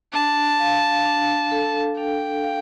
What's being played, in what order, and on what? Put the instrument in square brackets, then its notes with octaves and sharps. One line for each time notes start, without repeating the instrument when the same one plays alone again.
[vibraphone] D4 [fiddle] A5
[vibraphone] F5
D4
A4
[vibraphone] D4 [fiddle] G5
[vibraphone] F5